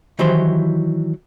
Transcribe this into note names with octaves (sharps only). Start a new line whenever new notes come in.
D#3 E3 F#3 E4 G4 C5